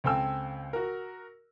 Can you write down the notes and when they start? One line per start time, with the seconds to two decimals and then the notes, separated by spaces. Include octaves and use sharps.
0.04 C#2 C4 A4 G5 G#5 E6
0.73 F#4 A#4